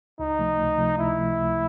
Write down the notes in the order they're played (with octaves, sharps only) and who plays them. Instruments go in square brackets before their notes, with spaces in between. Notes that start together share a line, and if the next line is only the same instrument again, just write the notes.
[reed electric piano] C#2 [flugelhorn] D#4
[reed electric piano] C3 F3 A3
C#2
C3 F3 A3
[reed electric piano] C#2 [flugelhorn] E4
[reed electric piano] C3 F3 A3
C#2